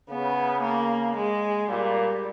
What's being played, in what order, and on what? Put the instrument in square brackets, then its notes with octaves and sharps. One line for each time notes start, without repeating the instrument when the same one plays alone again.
[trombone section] C#3 [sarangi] B3
[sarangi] A#3
G#3
[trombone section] A#2 [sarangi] G3